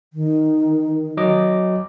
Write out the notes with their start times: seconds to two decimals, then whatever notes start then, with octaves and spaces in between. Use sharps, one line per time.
0.13 D#3
1.17 F#3 D#5 D6